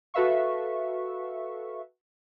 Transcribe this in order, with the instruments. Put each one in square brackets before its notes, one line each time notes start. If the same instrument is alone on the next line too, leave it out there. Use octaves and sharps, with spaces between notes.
[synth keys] F#4 A4 B4 E5 F5 C#6